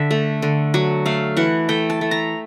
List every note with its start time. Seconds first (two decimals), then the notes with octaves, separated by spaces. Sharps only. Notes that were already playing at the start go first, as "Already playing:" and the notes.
Already playing: D3 E5
0.11 A3
0.42 D3
0.74 F#3
1.06 A3 F5
1.37 E3 F#5
1.69 A3 G5
1.90 A5
2.01 A3
2.11 A#5